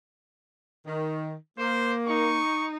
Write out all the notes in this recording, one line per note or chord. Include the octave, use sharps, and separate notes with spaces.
D#3
A#3 C5
D#4 C#6